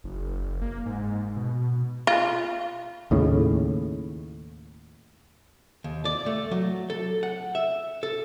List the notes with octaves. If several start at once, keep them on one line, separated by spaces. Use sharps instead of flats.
F#1
A#3
G#2
B2
F4
D#2 A2 C#3
D#2
D5
A3
F#3
A4
F#5
E5
A4